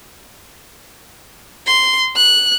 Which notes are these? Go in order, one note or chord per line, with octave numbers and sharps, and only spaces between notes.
C6
F#6